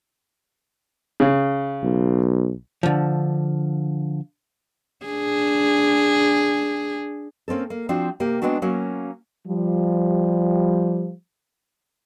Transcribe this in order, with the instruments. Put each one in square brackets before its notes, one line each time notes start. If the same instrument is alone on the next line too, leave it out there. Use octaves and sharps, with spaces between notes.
[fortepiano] C#3
[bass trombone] B1
[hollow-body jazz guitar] D3 F3
[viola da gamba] D4 G#4
[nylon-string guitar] A#3 C4 C#4 A4
A#3
F3 C4 D4 F4 F#4
C3 A#3 G4
G#3 B3 C4 D4 F#4
F#3 A#3 C#4 F#4
[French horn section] F3 G3